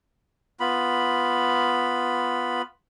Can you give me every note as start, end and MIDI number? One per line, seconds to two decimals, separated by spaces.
0.60 2.62 59
0.60 2.62 65
0.60 2.62 83